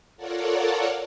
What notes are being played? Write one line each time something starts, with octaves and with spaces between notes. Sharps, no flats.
F4 A4 A#4 C#5 D5 F#5